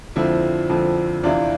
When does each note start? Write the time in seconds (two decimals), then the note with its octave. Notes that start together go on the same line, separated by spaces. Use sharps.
0.16 F2 D3 F3 C4 E4
0.70 F2 D3 F3
1.23 E2 C3 E3 D4 F4